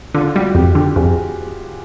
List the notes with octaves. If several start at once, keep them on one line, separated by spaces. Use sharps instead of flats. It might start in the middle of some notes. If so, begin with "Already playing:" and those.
D3 F4
G3 F#4
F2 G4
D3 G4
F2 G#4